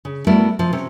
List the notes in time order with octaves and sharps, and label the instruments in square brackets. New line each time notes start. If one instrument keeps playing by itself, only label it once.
[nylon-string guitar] C#3
G3 A3 B3 E4 F#4 A#4
C3 F3
C3 C#4